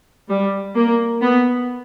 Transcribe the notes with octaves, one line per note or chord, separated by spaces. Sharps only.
G3
A#3
B3